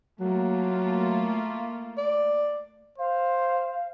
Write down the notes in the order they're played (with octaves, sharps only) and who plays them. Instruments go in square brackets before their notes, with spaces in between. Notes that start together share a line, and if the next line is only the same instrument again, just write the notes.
[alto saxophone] F#3 [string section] A3 A#3 F4
[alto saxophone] D5
[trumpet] C5 [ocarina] F5